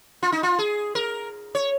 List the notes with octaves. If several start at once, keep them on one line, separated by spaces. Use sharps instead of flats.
F4
D#4
F4
G#4
A#4
C#5